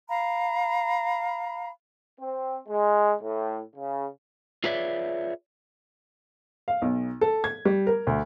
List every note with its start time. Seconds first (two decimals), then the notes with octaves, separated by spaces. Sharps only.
0.09 F5 A#5 B5
2.19 C4
2.68 G#3
3.21 A2
3.76 C#3
4.64 F4 G#4 B4 C#5 D5 E5
6.68 F5
6.82 B1
7.21 A4
7.44 G#6
7.65 G3
7.87 A#4
8.07 D2